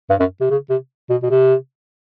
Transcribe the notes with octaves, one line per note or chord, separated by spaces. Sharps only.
G2
F#2
C3
C#3
C3
B2
B2
C3